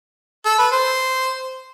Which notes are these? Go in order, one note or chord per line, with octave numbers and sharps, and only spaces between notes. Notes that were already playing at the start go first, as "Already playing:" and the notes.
A4
B4
C5